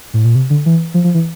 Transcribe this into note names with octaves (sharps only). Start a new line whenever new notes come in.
A2
A#2
C3
D3
E3
F3
F3
E3